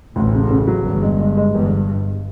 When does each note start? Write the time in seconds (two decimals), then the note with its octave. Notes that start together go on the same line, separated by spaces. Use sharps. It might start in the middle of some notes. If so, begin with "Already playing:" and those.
0.16 A1 D2 A2
0.33 C#3
0.50 C#3
0.67 F#3
0.85 G1 E2 G2
1.02 G#3
1.20 G#3
1.37 G#3
1.55 G1 E2 G2